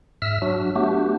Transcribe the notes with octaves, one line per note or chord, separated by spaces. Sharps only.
G#2 E5 E6 F6
F#3 D4 F#4
A3 B3 D4 F#4 G4